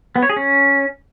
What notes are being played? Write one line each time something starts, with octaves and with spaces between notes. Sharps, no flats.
B3
C#5
G#4
C#4